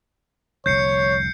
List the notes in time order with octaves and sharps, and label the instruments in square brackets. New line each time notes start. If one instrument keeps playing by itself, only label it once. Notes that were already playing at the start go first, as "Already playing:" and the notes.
[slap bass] F1 C2 D3 [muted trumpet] C#5 [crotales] G6 C7 C#7